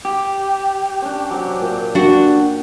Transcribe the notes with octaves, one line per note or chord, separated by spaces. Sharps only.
G4
C#4 D4
C3 F#3
A#2 G5
D4 F#4